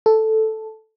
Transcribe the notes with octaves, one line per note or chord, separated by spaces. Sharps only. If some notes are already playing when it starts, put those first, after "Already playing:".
A4